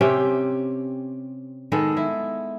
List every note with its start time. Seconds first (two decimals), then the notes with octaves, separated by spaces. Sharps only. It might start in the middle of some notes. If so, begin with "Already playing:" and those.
0.01 C3 C4 C#4 G4
1.72 D#3 G#3 B3 A4
1.97 E4